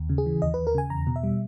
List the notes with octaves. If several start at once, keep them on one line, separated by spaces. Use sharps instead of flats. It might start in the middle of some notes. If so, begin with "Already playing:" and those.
Already playing: D#2
C#3
G#4
E3
D#2 D#5
D#2 B4
A#4
C#3 G#5
E2 A#5
B2
E5
G3